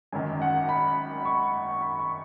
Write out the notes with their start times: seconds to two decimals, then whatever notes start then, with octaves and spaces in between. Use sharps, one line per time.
0.12 G#1 F#2 D#3 G#5
0.42 F#5
0.69 B5
1.25 C#6
1.81 B5
1.99 C#6